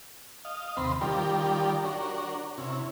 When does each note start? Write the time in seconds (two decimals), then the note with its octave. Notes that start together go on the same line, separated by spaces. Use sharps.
0.45 D#5 F5
0.77 D#2 C3 C4 B4 B5 C6
1.01 D#3 G3 F4 G4 A#4 D5
1.84 D4 F#4 A#4 C#5
2.58 C3 C#4 E4